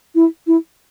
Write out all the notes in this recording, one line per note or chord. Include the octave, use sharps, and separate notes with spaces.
E4
E4